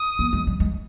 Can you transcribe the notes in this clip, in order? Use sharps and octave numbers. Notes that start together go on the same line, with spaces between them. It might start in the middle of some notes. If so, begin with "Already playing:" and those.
Already playing: D#6
A#3
G#3
G3
G#3